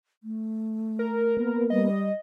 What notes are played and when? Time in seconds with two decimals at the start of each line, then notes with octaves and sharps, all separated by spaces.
0.23 A3
0.99 A#4
1.37 A#3 B3
1.70 G3 D#5